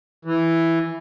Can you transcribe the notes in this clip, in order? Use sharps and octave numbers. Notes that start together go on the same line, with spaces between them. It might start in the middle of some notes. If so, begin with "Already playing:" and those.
E3